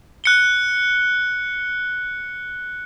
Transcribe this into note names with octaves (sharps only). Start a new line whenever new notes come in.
F#6 C#7 G7